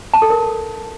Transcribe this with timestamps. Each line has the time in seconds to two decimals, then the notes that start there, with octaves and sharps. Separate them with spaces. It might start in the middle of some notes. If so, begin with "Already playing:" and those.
0.14 A5
0.22 A4
0.30 A#4